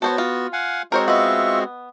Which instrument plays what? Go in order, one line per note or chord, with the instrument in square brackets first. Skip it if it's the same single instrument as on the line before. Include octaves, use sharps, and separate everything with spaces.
[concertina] B3 F#4 [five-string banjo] A4 C5 C#5
[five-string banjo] F4
[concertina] F5 F#5 G#5
[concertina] G#3 C4 F#4 [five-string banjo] A#4 C5 C#5
[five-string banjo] B3 D#5 [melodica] F4 E5 C#6